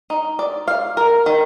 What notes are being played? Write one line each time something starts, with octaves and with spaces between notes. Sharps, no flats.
D#4
D5
F5
A#4
D#3